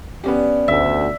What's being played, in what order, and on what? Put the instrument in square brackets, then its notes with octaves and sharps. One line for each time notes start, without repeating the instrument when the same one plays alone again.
[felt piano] B3 C#4 G4 [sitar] D4
[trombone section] D2 [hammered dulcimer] E5